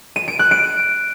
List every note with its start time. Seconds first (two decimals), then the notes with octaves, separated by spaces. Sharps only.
0.16 D#7
0.28 D7
0.39 F#6
0.51 D7